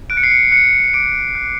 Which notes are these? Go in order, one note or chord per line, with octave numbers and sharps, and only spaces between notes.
F#6 D7
C#7
C7
C#7
F#6 C#7
D6 D7
F#6